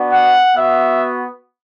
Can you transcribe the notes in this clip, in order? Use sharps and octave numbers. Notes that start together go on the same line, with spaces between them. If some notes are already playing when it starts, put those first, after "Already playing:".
Already playing: B3 D4 F#4
F#5
B3 F#4 E5